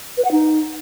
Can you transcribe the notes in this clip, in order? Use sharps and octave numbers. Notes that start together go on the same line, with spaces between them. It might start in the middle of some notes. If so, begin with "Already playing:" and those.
B4
F#5
D#4